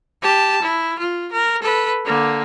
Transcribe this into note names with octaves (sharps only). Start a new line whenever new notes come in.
G4 A5
E4
F4
A#4
A4 B4
D3 A#3